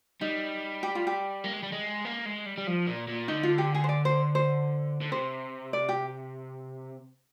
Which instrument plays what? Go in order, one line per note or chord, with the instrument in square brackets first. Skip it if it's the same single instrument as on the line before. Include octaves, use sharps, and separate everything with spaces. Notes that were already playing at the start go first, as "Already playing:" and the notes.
[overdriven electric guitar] G3 [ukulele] D#4
[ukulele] G4
F4
G4
[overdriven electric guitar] A#3
G#3
G3
G#3
A#3
G#3
G3
G3
F3
A#2
A#2
[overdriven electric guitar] D3 [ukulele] D#4
[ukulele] F4
G4
G#4
C5
D5
C5
C5
[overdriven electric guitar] D3
[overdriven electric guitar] C3 [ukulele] C5
[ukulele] D5
G4